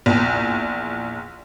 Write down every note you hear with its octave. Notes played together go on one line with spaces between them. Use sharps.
A#1 E2